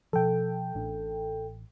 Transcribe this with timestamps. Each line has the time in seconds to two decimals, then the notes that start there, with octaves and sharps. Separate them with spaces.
0.13 B2 F3 A4 G5
0.75 A1 A2 D4